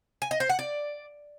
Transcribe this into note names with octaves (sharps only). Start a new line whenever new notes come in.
G#5
D#5
C5
F#5
D5